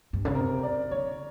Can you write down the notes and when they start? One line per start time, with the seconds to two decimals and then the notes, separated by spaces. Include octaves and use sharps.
0.13 G2
0.25 C#3
0.35 C3 A#4
0.63 D5
0.91 D3 C#5